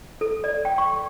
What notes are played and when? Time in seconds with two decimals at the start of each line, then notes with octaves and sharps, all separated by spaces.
0.21 A4
0.44 D5
0.65 G5
0.78 C#6